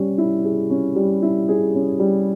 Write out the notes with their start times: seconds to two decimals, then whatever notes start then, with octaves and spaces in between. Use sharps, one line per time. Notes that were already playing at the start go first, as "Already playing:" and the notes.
Already playing: G3 C#4
0.18 E4
0.44 G#4
0.70 C#4
0.96 G3
1.22 E4
1.49 G#4
1.75 C#4
2.00 G3